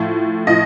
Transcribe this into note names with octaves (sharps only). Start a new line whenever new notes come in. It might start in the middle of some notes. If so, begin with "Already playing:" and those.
Already playing: A2 F3
A2 F3 D#5